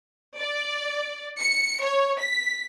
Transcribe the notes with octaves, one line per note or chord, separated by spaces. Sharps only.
D5
C#7
C#5
B6